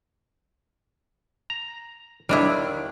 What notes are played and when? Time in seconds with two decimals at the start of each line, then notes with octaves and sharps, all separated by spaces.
1.50 A#5
2.29 D#2 D3 D#3 G3 D4 E4